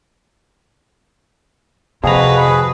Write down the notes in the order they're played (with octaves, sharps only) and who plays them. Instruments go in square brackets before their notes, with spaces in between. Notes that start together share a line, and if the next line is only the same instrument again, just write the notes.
[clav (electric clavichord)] F2 A#5 [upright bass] C3 [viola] F#4 B4 [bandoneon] G#4